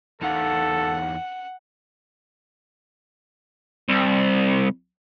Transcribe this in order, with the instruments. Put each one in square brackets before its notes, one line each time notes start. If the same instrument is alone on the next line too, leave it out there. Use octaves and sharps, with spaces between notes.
[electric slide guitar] E2 D#4 F5 [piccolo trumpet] A4 [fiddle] F#5
[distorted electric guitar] C2